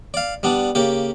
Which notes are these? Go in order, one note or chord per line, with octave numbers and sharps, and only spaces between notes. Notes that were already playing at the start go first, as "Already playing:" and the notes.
D5 F5
G3 B3 D4
C#3 A#3 G4